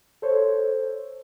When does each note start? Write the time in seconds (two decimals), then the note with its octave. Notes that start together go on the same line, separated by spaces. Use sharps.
0.22 A4 C5 C#5